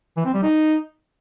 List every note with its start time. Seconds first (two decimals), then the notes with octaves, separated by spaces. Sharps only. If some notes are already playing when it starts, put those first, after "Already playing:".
0.17 E3
0.26 C4
0.34 G3
0.43 D#4